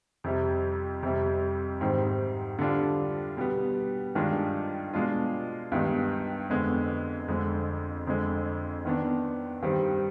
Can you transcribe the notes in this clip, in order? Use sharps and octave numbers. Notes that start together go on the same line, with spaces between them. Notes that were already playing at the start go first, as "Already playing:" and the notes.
F2 C3 G3
F2 C3 G3
G#2 D#3 G3 C4
D3 G3 D4 F4
B2 G3 B3
G2 D#3 G#3 D4 F4
B2 G#3 D4 F4
G2 D#3 G#3 B3 D#4
F2 D3 G#3 B3
F2 D3 G#3
F2 D3 G#3
D#3 B3 D4
G2 D#3 G3 C4